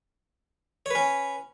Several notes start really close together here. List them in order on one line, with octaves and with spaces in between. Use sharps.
C#5 B4 C#4